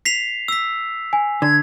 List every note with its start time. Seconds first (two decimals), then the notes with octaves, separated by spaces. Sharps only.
0.05 B6 C7 F7
0.48 E6 B6
1.13 G#5
1.42 D3 G#6